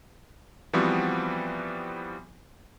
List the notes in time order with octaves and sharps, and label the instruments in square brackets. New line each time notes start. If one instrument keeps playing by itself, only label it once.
[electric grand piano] E3 F3 G3 B3 C4 F#4